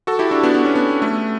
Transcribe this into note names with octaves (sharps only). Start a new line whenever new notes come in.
F#4 A4
E4 G4
D4 F#4
B3 D4
B3
C#4
B3
A3